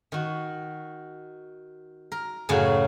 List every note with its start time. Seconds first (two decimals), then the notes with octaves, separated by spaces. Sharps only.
0.12 D#3 F#4
2.12 A#4
2.49 F#2 A2 C#3 F#3